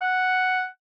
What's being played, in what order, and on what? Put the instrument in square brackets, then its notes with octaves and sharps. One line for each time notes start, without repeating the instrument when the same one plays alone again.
[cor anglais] F#5